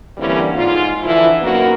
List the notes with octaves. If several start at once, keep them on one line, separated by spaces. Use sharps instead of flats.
D3 E3 G3 A#3 C4 C#4
G#2 F4
D3 E3 F3 E4
F#2 A#3 B3 D#4 F#4 A#4